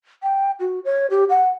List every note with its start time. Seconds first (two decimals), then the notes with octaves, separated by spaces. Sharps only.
0.23 G5
0.60 F#4
0.85 C#5
1.10 G4
1.30 F#5